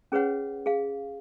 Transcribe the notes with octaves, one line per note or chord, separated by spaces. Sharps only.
C#4 G#4 B4 C#5 F#5
G#4 F5